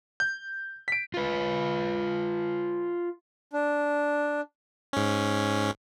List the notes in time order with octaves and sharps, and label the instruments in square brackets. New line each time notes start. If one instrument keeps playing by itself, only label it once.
[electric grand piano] G6
B6 D7
[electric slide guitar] F4 B4
[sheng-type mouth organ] D4
[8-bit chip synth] G#2 C#4